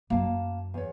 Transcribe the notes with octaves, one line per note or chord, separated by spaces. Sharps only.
F#2 F#3 A#3 F5 A5
E2 C#5